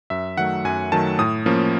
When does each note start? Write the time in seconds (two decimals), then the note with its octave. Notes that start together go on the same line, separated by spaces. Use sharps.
0.10 F#2 E5
0.37 D#3 F#3 A3 F#5
0.65 F#2 G#5
0.92 D#3 F#3 A3 A5
1.19 A2 D#6
1.46 F3 A#3 C#4